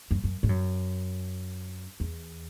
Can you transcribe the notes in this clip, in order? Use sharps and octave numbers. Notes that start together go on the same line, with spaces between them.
F#2
F#2
G#2
F#2
E2